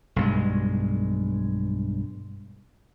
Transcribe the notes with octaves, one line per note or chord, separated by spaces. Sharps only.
B1 G2 G#3